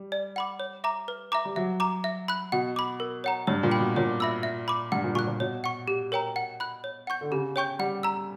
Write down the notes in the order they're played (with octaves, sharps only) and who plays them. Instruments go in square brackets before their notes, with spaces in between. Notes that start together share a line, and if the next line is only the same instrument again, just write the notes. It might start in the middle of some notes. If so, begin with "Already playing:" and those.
Already playing: [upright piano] G3
[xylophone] D5
F#5 B5 D6
C#5
E5 A#5 D6
B4
E5 A#5 D6
[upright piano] G3
[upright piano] F#3 [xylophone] E5
[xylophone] A#5 D6
E5
B5 F#6
[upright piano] B2 [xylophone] F#5
[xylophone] B5 D6
A#4
C#5 F#5 A#5
[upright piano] G2 [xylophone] C#5
[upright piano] A#2
[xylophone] G5 B5
[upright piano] B2
[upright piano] A#2 [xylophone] C#5
[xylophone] E5 B5 E6
E5
B5 D6
[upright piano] G2 [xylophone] F#5
[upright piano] A#2
[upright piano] A#2 [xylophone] C#6 F#6
[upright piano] A#2
[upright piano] B2 [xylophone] C#5
[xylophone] F#5 C#6
G4
A#4 C#5 G5 A#5
F#5
B5 F#6
C#5
F#5 C#6 G6
[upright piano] D3
[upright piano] C#3 [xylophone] G4
[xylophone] C#5 G5 C#6 G6
[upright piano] G3 [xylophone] F#5
[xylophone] A#5 E6